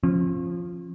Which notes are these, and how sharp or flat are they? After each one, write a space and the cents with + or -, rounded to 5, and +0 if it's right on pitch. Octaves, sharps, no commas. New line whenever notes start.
F3 +0 C#4 -40